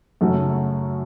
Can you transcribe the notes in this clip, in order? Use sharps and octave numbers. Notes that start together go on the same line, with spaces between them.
F#2 C#3 A3 C#4 F#4